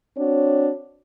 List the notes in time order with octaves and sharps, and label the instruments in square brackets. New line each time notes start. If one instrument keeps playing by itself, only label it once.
[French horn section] C4 D4 F#4 C#5